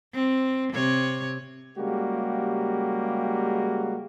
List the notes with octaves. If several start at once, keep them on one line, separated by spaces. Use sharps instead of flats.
C4
C3 C#5
C#3 G3 G#3 A#3 F#4 G4